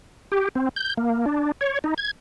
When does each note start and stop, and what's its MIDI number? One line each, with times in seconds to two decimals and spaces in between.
0.32 0.49 67
0.55 0.69 60
0.76 0.94 91
0.97 1.25 58
1.26 1.52 62
1.61 1.79 73
1.84 1.94 63
1.98 2.11 92